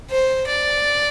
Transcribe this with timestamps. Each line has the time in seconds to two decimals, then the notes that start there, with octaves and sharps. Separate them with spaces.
0.11 C5
0.47 D5